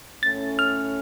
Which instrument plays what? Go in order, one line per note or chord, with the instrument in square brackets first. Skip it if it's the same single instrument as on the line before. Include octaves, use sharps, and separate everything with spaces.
[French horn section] A2 A3 C#4 [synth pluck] A6
[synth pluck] F6